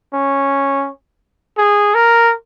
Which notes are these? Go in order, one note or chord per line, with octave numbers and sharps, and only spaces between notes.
C#4
G#4
A#4